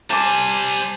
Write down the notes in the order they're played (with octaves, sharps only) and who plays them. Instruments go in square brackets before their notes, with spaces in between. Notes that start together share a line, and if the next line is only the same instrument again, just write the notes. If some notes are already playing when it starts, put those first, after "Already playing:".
[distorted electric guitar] G3 C5 [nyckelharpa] G#5 [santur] A5 D6